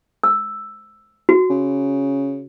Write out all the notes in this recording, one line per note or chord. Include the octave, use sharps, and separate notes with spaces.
E6
F#4
C#3